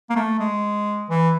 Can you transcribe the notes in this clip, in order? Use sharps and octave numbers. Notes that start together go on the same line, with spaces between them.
A#3
A3
G#3
E3